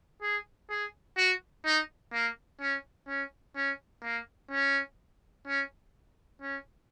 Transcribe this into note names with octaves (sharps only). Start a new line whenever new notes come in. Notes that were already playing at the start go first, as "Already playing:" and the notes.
G#4
G#4
F#4
D#4
A#3
C#4
C#4
C#4
A#3
C#4
C#4
C#4